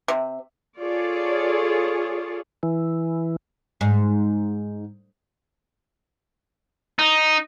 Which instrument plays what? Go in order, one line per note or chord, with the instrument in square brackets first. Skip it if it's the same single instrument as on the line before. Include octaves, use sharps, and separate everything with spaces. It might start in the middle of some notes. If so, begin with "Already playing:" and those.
[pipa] C3
[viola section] F4 G#4 A4 C#5 D5
[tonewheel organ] E3
[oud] G#2
[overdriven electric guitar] D#4